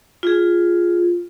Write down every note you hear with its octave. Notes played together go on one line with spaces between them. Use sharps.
F4 G#4